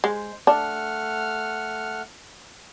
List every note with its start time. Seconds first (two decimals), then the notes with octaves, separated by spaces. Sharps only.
0.04 G#3 C5
0.47 A3 D4 F#5 F6